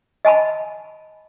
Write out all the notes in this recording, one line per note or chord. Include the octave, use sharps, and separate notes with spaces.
D#5 G#5 A5 B5